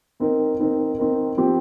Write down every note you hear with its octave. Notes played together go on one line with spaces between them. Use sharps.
D#3 C4 D#4 A#4
D#3 C4 D#4 A#4
D#3 C4 D#4 A#4
F3 C4 G4